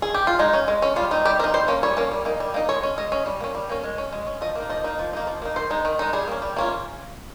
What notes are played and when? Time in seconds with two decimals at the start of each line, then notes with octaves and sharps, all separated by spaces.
0.02 G#4
0.14 G4
0.27 F4
0.39 G#3 D#4
0.53 C#4
0.68 G#3
0.82 C#4
0.96 G3 F4
1.11 C4 D#4
1.25 G3 G4
1.39 C4 A#4
1.44 D#4
1.54 G3 C5
1.68 A#3 C#4
1.83 G3 C#5
1.97 A#3 C#4
2.11 G3
2.25 A#3 D#4
2.40 G3
2.54 A#3 D#4
2.69 G#3 C#5
2.83 C#4
2.98 G#3 D#5
3.12 C#4
3.26 G3
3.40 A#3 C#4
3.55 G3
3.69 A#3 C#4
3.84 G#3
3.98 C#4
4.13 G#3
4.27 C#4
4.41 F3 D#5
4.55 A#3 D#4
4.69 F3 D#5
4.84 A#3 D#4
4.99 F3
5.13 A#3 D#4
5.27 F3
5.42 A#3 D#4
5.56 D#3 C5
5.70 G#3 D#4
5.85 D#3
5.99 G#3 D#4
6.13 G3 G#4
6.28 A#3 C#4
6.42 G3
6.57 A#3 C#4 F4